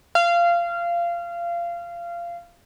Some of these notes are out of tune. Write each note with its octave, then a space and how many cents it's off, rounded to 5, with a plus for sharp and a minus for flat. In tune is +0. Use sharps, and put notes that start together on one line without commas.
F5 -20